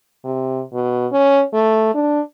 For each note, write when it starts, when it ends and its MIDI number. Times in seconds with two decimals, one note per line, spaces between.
0.25 0.62 48
0.73 1.07 47
1.12 1.44 61
1.53 1.92 57
1.95 2.21 62